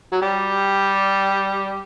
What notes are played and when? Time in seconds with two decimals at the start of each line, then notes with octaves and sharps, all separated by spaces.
0.12 F#3
0.22 G3